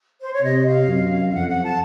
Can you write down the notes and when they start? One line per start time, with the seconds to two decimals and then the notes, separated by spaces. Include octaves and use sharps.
0.21 C5
0.33 C#5
0.42 C3 D#5
0.66 F5
0.88 F#2
1.29 F5
1.33 F2 F#5
1.48 F#5
1.63 A5